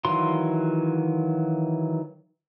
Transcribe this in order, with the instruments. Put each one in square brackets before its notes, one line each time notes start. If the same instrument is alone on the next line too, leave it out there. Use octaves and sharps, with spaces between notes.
[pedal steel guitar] D#3 E3 F#3 F4 C6